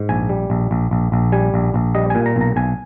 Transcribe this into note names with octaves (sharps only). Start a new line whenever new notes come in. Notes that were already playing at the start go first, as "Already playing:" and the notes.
Already playing: G#2
A#1 G#5
G3
A#1
A#1
A#1
A#1
G3 G#5
A#1
A#1
G3 D#5
A#2 G#5
A#5
B1 A#5
B1 G#5